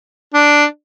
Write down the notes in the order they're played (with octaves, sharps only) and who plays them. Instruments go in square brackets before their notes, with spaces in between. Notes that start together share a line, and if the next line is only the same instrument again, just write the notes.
[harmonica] D4